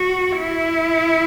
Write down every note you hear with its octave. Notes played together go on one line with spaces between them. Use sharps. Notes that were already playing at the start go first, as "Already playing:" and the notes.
Already playing: F#4
E4